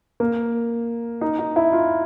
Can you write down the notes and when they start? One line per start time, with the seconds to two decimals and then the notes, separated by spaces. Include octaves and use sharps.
0.20 A#3
1.21 D#4
1.39 D#4
1.56 E4
1.73 F4